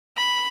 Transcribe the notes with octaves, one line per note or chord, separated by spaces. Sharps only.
B5